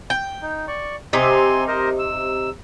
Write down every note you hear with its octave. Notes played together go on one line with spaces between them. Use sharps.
G5
D#4
D5 C#6
C3 C4 D#4 G#5 C6
A#4 C5 D#5
E6